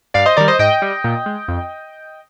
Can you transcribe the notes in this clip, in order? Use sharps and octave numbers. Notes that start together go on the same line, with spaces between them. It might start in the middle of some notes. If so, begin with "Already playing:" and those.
G2 D5 F5
C5 D#5
D#3 G3 A#4 D5
C5 D#5
G#2 D#5 G5
G3
A#2
G#3
F2